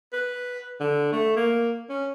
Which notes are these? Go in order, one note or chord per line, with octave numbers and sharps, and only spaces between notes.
B4
D3
A3
A#3
C#4